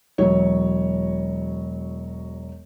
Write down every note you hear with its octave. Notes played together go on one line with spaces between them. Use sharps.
E1 F#3 C#5